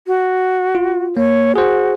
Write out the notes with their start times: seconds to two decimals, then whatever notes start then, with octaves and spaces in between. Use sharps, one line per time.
0.07 F#4
0.75 F4
1.17 A#3 C#5
1.56 F#4 G#4 C5